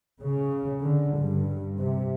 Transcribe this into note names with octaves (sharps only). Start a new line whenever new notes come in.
C#3
D3
G2
C3